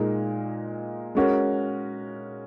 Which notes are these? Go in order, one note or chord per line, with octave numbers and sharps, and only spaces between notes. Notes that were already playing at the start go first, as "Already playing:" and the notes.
Already playing: A#2 G#3 D#4 A#4
G#3 C#4 F#4 A#4